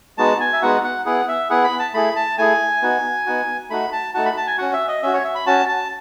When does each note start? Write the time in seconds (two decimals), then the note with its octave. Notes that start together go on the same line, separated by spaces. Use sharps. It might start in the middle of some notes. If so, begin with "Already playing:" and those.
0.18 G#3 B3 D#4 F#4 A5
0.40 G#5
0.53 E5
0.62 G#3 B3 D#4 F#4 F#5
0.84 F#5
1.06 B3 E4 G#4 F#5
1.28 E5
1.50 B3 E4 G#4 F#5
1.64 B5
1.80 A5
1.94 A3 E4 G#4 B5
2.16 A5
2.38 A3 E4 G#4 G#5
2.82 B3 D#4 F#4
3.26 B3 D#4 F#4
3.70 A3 D#4 F#4 B5
3.92 A5
4.14 A3 D#4 F#4 A5
4.25 B5
4.37 A5
4.47 G#5
4.58 C#4 F#4 F#5
4.73 E5
4.88 D#5
5.03 C#4 F#4 E5
5.13 C#5
5.24 E5
5.35 B5
5.46 C#4 F#4 A5
5.68 A5